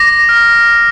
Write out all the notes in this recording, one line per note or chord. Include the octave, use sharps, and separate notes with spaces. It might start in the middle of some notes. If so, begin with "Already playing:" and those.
Already playing: D6 A#6
F6